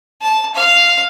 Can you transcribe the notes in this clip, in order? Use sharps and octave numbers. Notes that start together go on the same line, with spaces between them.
A5
F5